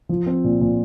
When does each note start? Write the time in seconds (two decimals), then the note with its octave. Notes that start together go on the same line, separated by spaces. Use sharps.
0.09 F3
0.26 C4
0.44 A#2
0.61 A#2